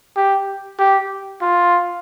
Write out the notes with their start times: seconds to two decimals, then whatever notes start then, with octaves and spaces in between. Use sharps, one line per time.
0.16 G4
0.79 G4
1.42 F4